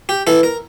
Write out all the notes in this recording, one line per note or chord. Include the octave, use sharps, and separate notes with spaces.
G4
E3 A4
A#4